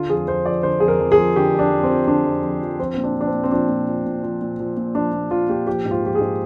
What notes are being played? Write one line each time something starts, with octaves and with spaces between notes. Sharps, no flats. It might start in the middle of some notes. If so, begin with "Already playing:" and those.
Already playing: D3 F4
F2 G#4
F2 C5
F3 D5
D3 C5
F2 G#4
A#4
F2
G#4
F3
D3 G4
F2
D4
F2
C4
F3
D3 D4
F2
F2
F3
F3 C4
C4
A#2
D4
F3
D4
C4
A#2
C4
F3 D4
A#2
F3
A#2
F3
A#2
F3
A#2
F3 D4
A#2
F3 F4
A#2 G4
F3 G4
G#2
F4
F3 G4
G#4
G#2